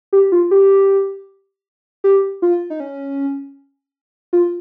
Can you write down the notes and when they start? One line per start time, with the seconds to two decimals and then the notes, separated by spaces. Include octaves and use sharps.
0.13 G4
0.32 F4
0.51 G4
2.04 G4
2.42 F4
2.70 D#4
2.80 C#4
4.33 F4